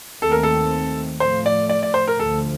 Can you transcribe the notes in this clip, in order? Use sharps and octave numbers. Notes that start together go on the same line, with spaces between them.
D#2 D#3 A3 C4 A4
A#4
A4
A2 F3 A3 C5
D5
D5
D5
C5
A#4
D2 D3 F3 A4